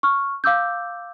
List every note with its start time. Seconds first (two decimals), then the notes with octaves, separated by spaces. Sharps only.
0.03 C#6 F6
0.44 F5 D6 E6 G6